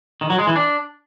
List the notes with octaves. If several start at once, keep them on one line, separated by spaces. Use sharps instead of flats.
D#3
F#3
G#3
E3
D4